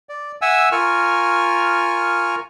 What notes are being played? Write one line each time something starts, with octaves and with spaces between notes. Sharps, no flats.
D5
E5 F#5 G#5 E6
F4 A#4 G#5 C#6 F6